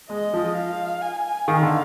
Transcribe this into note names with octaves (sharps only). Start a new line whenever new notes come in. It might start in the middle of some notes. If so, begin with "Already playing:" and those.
G#3 D#5
F3
F5
G#5
D#3 F5
D3